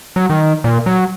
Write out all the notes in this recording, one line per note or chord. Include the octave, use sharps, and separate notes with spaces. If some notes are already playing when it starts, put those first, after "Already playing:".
F#3
D#3
A#2
F#3